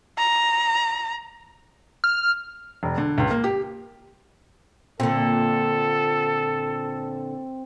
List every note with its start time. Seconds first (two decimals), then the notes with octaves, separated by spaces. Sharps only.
0.18 A#5
2.04 F6
2.83 E1
2.97 D3
3.18 C#2
3.31 A#3
3.44 G4
5.00 A#2 D3 C4 A4